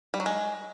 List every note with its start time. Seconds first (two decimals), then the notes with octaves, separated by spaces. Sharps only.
0.14 G3
0.20 F#3
0.26 G#3